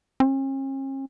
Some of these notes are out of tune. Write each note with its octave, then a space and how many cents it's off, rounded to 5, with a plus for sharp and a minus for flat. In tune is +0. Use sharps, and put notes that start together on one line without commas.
C#4 -45